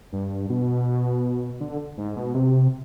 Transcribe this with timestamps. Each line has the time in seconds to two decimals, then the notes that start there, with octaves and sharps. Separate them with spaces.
0.13 G2
0.50 B2
1.61 D3
1.98 G#2
2.16 B2
2.34 C3